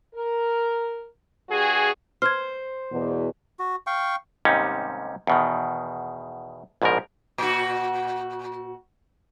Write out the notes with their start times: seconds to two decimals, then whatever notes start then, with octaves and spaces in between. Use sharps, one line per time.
0.14 A#4
1.50 G2 F#4 G#4
2.22 C5 F6 G#6
2.91 E2 B2
3.59 F#4
3.87 F5 G5 C#6
4.45 D#2 G#2 C3 G3 C#4 D#4
5.27 E2 B2 D#3
6.82 A#1 G#2 B2 F3 A#4
7.38 A#2 F#4